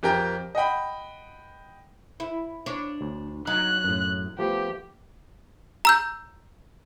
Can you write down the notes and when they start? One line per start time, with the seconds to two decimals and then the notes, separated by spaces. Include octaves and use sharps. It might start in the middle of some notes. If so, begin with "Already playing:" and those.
0.03 F2 G4 A#4 G5
0.55 D#5 F#5 G5 B5
2.20 E4
2.66 D4 C#5
3.01 D2
3.47 F#3 D#4 F#6
3.84 F#2 A2
4.39 F3 A3 B3 G4
5.85 A#5 E6 G6